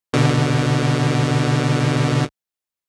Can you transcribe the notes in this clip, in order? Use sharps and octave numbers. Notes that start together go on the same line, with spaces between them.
B2 D3